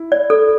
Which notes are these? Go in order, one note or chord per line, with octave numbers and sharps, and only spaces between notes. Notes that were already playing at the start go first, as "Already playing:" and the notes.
Already playing: E4
D5
A4